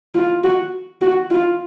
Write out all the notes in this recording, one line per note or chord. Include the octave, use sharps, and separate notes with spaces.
F4
F#4
F#4
F4